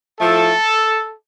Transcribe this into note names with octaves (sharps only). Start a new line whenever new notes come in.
A2 F3 A3 A4